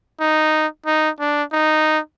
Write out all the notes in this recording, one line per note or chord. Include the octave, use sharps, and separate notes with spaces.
D#4
D#4
D4
D#4